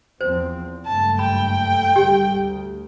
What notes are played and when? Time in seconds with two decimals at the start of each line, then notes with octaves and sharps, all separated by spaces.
0.21 E2 F3 C4 C5
0.86 F#1 G2 A3 A5
1.19 G5 B5
1.96 G#1 D3 G3 G4
2.37 D2